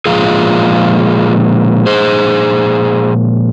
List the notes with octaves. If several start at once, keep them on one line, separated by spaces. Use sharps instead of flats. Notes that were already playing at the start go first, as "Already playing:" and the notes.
A#2 F3 G#3 F4 G#4
G#4 C5